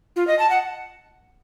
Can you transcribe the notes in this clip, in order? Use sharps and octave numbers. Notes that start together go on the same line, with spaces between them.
F4
D#5
A5
F#5